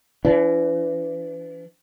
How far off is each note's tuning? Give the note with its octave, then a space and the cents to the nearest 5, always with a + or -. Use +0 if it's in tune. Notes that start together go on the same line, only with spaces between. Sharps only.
E3 +30 D4 -40